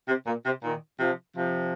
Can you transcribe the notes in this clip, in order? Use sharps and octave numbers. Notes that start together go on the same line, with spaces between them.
C3
A#2
C3
A#2 D#3
C3 F3
C3 F3